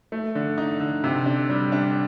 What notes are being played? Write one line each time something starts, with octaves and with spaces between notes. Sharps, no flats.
A3
D3
D#4
D3
C3
D4
G3
D4